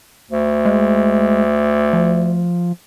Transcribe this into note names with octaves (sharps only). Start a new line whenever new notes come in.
D2
G#3
F3